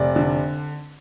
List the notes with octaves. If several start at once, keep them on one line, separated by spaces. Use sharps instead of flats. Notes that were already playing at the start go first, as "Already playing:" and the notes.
Already playing: F1 D5
D3